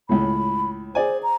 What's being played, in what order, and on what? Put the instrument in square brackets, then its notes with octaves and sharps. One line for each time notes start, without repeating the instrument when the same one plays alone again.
[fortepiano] C#2 A2 [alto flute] B5
[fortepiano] G#4 D5 G#5 [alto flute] C5
[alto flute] A#5